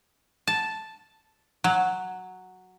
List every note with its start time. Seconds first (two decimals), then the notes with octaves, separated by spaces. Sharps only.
0.47 A5
1.64 F#3